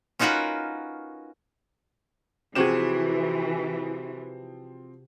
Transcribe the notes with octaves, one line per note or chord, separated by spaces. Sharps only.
C#4 D#4 F4 F#4 A#4 B4
C3 E3 F3 C4 F#4 G#4 E7